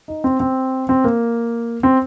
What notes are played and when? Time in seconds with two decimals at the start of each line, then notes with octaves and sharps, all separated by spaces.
0.08 D#4
0.24 C4
0.40 C4
0.89 C4
1.04 A#3
1.83 C4